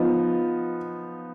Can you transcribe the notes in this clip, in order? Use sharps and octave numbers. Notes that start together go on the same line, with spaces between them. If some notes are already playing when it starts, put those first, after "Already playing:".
Already playing: F3 B3 D#4